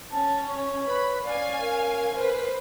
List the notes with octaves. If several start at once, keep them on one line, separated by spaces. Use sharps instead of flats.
C#4 A5
C#5
B4 B5
C#4 D5 F5 G#5
A#4
B4 C5